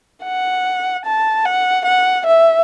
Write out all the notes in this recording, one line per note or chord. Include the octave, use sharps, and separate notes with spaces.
F#5
A5
F#5
F#5
E5